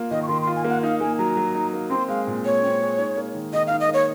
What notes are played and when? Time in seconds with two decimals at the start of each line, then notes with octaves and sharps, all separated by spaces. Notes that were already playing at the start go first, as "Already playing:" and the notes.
Already playing: A#3 F4
0.11 D#3 D#5
0.22 C#6
0.28 D#3 C6
0.42 C6
0.47 F4
0.56 G#5
0.64 A#3 F5
0.69 F#5
0.83 D#4 F5
1.00 A#3 G#5
1.18 F#3 A#5
1.37 F#3
1.55 D#4
1.73 A#3
1.90 C4 C6
2.08 G#3 F5
2.27 A#2
2.45 A#2 C#5
2.63 C4
2.81 G#3
2.98 D#4
3.17 A#3
3.34 D#3
3.53 D#3 D#5
3.67 D#4 F5
3.80 D#5
3.89 A#3 C#5